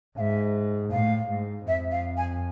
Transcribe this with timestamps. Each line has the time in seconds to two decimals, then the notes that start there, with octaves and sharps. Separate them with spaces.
0.17 G#2 F5
0.20 E5
0.92 A2 F5
1.29 G#2
1.67 F2 E5
1.92 F5
2.17 G#5